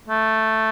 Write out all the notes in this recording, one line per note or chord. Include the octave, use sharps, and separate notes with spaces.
A3